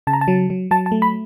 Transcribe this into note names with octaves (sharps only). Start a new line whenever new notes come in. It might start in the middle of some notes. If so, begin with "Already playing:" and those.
C#3 A5
A#5
A5
F#3
F#3
F#3 A5
A5
A3
B5